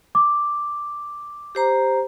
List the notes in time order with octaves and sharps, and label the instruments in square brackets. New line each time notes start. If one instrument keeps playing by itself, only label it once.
[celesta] D6
[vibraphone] G4 C5 A#5